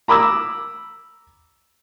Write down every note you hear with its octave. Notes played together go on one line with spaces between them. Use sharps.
A#5 B5 D6 E6